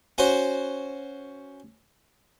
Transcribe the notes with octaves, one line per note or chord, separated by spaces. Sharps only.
C#4 F#4 C5